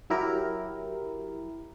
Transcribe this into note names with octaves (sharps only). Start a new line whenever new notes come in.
F#3 E4 G4 A#4